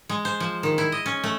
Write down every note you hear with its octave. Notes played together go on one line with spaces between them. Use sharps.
G#3
C5
F3
D#3
E4
D#5
C#4
A3